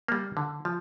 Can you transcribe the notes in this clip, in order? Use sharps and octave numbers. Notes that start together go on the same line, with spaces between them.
G3 A#3
D3
F3